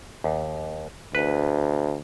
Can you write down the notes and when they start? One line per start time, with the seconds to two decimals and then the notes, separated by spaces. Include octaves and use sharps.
0.24 D#2
1.15 D2 B4